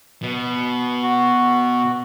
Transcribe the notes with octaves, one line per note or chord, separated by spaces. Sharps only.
B2
F#4